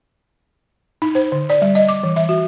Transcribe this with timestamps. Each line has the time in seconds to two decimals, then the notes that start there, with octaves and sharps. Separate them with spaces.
1.02 D#4
1.15 C5
1.32 D3
1.50 D5
1.62 G3
1.75 D#5
1.89 D6
2.03 E3
2.16 E5
2.29 F#4